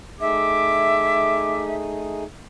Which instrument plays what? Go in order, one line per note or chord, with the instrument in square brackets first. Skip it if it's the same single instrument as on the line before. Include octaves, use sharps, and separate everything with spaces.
[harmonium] A3 D#4 G#4 [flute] E5 [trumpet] D6